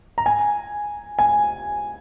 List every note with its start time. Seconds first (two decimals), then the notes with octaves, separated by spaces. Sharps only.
0.18 A#5
0.26 G#5
1.19 G#5